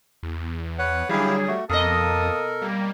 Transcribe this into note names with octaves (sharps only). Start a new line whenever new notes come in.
E2
B4 C#5 F#5
D3 F#3 G3 E4 G4 G#4 F5
A3 F#4
F2 B2 A#3 A4 A#4 D#5 A5 D#6
G3 A#3